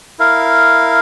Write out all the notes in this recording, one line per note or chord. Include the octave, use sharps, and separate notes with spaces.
E4 A#4 F5